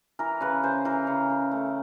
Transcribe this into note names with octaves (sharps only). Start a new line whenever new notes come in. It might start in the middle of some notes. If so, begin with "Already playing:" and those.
E3 A#4
C#3 B4
C#3 C5
E3 A#4
C#3
C#3
A3